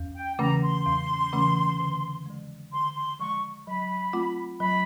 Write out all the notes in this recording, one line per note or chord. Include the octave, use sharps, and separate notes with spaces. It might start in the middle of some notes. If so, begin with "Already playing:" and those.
Already playing: E2
G5
C#3 E3 A3 C#4 A#5
C6
E2
C#3 E3 A3 C#4
D3
F3 G#3
D3 C6
C6
F3 G#3 C#6
F#3 B5
A3 C4 F4
F#3 B5